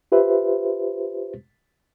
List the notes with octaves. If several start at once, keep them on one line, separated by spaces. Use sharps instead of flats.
F4 G4 B4 C5 E5